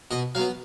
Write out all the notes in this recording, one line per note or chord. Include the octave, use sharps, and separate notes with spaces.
B2 D#5
F#3 B3 F5